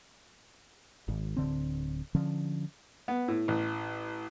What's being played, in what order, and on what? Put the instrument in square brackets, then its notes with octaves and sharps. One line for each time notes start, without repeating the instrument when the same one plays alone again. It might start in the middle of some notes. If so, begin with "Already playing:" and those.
[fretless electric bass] G#1
D1 D3 C4
D3 F3 C#4
[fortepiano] B3
A2
A1